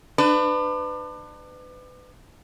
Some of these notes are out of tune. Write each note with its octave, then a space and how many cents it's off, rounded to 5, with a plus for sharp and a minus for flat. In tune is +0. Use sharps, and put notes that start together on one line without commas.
D4 +35 B4 +30